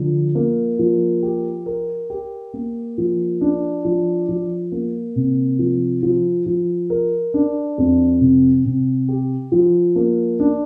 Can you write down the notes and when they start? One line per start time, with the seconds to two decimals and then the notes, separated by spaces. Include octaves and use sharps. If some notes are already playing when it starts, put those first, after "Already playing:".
Already playing: D3 F3
0.35 A#3
0.79 F3
1.23 G4
1.66 A#4
2.10 G4
2.54 A#3
2.98 F3
3.41 D4
3.85 F3
4.29 F3
4.72 A#3
5.16 C3
5.59 F3
6.03 F3
6.46 F3
6.90 A#4
7.34 D4
7.78 F2
8.21 C3
8.65 C3
9.08 G4
9.52 F3
9.96 A#3
10.40 D4